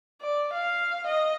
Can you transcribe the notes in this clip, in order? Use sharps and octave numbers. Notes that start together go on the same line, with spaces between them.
D5
F5
D#5